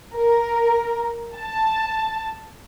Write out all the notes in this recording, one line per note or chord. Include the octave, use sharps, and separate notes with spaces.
A#4
A5